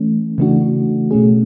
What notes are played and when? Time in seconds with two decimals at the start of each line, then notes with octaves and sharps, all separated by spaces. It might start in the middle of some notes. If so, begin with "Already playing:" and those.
Already playing: E3 A3 C#4
0.38 C#3 E3 A3 D4 F#4
1.11 B2 A3 C#4 G#4